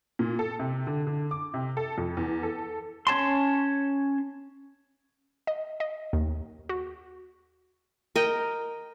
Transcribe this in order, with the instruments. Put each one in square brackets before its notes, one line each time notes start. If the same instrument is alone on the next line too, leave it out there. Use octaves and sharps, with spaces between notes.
[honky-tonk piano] A#2
A4
C3
D3
D3
D6
C3
A4
F2
E2
A4
[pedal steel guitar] C#4 C#5 A5 C6
[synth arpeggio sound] D#5
D#5
D#2
F#4
[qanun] A#4 D#5 G5